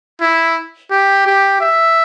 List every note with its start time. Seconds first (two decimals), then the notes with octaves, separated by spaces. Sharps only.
0.21 E4
0.91 G4
1.26 G4
1.60 E5